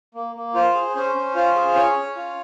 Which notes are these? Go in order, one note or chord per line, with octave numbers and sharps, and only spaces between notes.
A#3
A#3
F4 C5
G#4
C#4 C5
C#4
F4 C5
G#4
C#4 C#5
C#4
F4